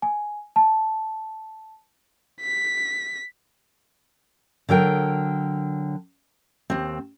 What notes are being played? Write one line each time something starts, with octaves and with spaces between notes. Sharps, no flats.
G#5
A5
B6
D3 F#3 A#4 G5
D#2 C4